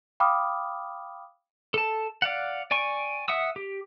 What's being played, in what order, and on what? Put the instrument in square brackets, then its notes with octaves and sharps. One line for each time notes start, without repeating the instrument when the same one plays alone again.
[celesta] F5 G5 B5 D6 D#6 F6
[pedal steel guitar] A4 A5
D5 F5 F#5
D5 G5 G#5 C#6
E5 F#5 D#6 E6
G4